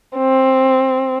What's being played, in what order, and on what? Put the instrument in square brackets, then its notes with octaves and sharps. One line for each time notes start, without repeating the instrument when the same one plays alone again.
[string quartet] C4